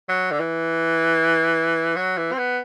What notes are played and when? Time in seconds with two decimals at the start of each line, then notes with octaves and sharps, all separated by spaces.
0.09 F#3
0.31 D3
0.40 E3
1.96 F#3
2.17 E3
2.32 C4
2.38 B3